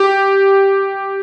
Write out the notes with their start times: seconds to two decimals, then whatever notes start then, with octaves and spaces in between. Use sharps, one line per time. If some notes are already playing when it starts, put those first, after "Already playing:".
Already playing: G4